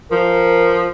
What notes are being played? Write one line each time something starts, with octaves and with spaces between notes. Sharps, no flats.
F3 A#4